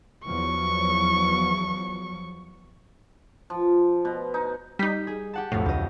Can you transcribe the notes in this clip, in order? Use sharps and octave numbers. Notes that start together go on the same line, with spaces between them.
E2 F3 F#3 C#6
F3
B2
D#4
G3 D#4 G6 B6
G#4
G4 F#5 A5
B1 F2 A2
D2 G4 D#5